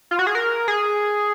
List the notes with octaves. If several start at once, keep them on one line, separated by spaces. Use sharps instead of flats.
F4
F#4
G#4
A#4
G#4